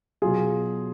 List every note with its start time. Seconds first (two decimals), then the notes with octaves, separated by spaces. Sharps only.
0.22 B2 F#3 F4 G#4